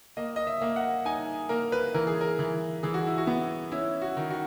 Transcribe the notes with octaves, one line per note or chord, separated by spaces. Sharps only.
A#3 D#5
D#5
E5
A#3
F#5
D#4 G#5
A#3 A#4
B4
E3 A#4
G#4
A#4
E3
E3 G#4
F#4
E4
F#4
B3
C#4 E4
F#4
D#3
F#4